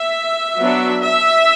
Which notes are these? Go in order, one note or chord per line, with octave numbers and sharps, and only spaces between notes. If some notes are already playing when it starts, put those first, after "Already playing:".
Already playing: E5
F#3 B3 D4
E5